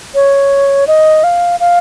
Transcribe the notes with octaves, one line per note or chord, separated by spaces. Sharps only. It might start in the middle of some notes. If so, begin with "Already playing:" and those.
C#5
D#5
F5
F5